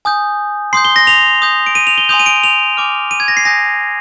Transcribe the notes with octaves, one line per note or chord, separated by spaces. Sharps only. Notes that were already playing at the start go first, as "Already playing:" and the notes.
G#5 D#6 G6
C6 D#6 G6 C7
G7
A#6
F7
C6 D#6 G6
D7
D#7
F7
G7
G#5 C6 D#6 G6 F7
D#7
D7
F7
G#5 D6 F6
D#7
G#6
A#6
C7
G#5 D#6 G6 A#6